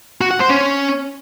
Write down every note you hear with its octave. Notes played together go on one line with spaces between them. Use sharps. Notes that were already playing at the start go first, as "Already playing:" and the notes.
F#4
F#5
C5
C#4